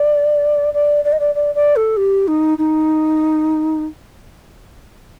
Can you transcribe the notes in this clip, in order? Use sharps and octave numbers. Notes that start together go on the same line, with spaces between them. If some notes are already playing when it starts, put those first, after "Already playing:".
Already playing: D5
D5
D5
D#5
D5
D5
D5
A4
G4
D#4
D#4